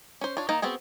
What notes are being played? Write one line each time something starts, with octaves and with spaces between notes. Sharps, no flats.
C#4 C5
D4 F4 C#5
D#3 A#3 D#4 D#5 A#5
B3 C4 F#4 G#4